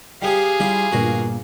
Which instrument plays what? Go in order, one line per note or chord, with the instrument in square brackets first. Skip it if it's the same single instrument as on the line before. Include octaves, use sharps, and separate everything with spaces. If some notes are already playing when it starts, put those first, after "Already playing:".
[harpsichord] G3 B3 G4 [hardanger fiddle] G#4 F5 [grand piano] G5
[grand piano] G3 [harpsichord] E4 F4 G4
[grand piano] G1 A#2 [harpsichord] F#4 A#4